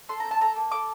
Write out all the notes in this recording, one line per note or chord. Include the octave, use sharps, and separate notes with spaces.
A4 C6
C4 A#5
A5
A4 A#5
A#3
A4 D6